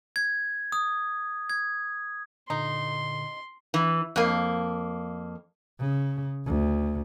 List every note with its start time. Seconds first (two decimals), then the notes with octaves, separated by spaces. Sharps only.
0.16 G#6
0.72 D#6
1.50 G#6
2.50 A#2 D3 D#4 C6
3.74 E3
4.16 F2 A#3
5.80 C#3
6.46 D2